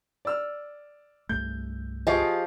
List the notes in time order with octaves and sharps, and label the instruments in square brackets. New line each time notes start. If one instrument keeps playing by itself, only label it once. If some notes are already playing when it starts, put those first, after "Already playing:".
[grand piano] D5 E6 F6
[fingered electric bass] C2 G2 A3 [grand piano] G6
[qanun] F3 G4 G#4 [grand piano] D#5 F5 C#6